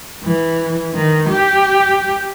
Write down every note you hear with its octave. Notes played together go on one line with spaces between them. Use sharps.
E3
D#3
G4